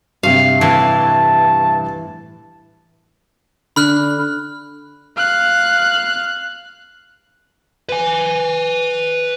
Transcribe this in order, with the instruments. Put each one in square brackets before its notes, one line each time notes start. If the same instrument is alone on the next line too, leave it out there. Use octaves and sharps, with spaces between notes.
[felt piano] G2 C3 [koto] F5
[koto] A2 [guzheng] E3 [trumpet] A5
[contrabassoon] D3 [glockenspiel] B5 F6 F#6
[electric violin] F5 F#6
[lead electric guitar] B4 G#5